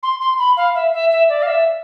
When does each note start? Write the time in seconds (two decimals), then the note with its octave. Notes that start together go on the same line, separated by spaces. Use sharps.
0.03 C6
0.20 C6
0.39 B5
0.57 F5
0.75 E5
0.93 E5
1.11 E5
1.29 D5
1.42 F5
1.47 E5